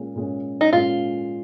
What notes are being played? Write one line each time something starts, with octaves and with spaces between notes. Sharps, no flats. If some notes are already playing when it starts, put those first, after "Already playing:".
Already playing: A#2 G#3 C#4
A#2 G#3 C#4
D#4
A#2 G#3 C#4 F4